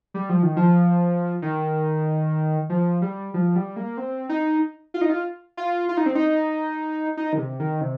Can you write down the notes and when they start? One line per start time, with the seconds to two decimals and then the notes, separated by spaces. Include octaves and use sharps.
0.14 G3
0.29 F3
0.43 D#3
0.57 F3
1.42 D#3
2.70 F3
3.02 G3
3.34 F3
3.56 G3
3.76 A#3
3.97 C4
4.29 D#4
4.94 F4
5.01 D#4
5.09 F4
5.57 F4
5.89 F4
5.97 D#4
6.06 C4
6.15 D#4
7.17 D#4
7.33 D#3
7.38 C3
7.60 D#3
7.81 C3